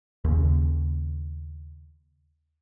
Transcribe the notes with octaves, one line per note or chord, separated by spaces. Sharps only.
D#2 C#3